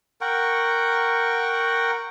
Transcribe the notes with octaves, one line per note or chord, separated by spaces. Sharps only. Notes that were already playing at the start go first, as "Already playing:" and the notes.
A#4 F#5 G5 C#6